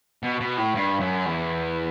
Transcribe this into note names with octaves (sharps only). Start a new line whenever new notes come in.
B2
B2
A2
G2
F#2
E2